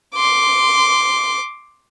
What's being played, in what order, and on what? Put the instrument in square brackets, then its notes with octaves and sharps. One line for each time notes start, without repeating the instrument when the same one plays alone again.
[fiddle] C6 D6